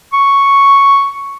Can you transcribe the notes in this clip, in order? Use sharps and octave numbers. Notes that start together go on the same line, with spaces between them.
C#6